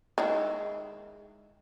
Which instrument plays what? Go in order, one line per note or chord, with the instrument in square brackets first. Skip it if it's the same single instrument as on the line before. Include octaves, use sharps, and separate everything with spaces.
[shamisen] D#3 G#3 E4